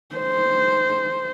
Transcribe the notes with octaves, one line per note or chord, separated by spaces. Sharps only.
C5